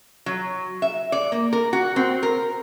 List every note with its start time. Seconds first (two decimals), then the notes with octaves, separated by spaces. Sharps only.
0.26 F#3
0.82 E5
1.12 D5
1.32 A#3
1.53 A#4
1.73 F#4
1.96 C4
2.23 A#4